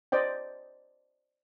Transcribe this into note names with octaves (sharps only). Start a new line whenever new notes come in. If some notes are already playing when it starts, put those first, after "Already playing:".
C5 D5 D#5 G5